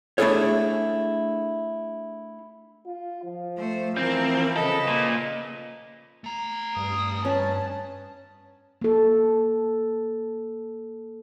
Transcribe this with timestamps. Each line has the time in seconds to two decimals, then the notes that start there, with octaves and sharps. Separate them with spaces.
0.18 A3 D4 E4 G#4 A4 C#5
2.86 F4
3.24 F3
3.58 A3 C5
3.97 E3 C4 A#4
4.56 C#3 A4 B4 D#5
4.88 A#2
6.24 A3 A#5
6.76 G2 D#6
7.25 C#4 B4 A5
8.82 A#3 A4